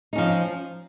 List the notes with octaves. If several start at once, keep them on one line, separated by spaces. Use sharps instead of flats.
F3 C#4 D#4